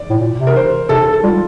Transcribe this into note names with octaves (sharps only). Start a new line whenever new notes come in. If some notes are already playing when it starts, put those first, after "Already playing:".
Already playing: D5
A2
A#2
C3
A#4
C5
C3 A4
A4
A4
G3 F4